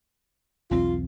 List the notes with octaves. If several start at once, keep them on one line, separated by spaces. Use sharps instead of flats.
B1 E2 C4 F4